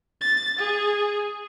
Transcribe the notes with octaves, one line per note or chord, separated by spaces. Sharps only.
A6
G#4